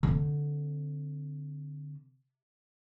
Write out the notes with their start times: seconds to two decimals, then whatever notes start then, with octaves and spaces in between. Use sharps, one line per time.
0.03 D3 C4